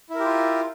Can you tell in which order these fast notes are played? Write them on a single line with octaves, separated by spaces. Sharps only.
E4 A#4 G4 F4